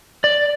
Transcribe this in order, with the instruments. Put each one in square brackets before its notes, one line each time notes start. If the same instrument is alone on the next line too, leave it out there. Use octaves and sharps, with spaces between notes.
[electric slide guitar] D5